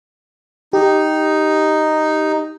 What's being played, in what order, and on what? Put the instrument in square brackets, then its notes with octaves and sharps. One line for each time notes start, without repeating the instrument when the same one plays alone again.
[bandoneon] D#4 [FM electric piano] G4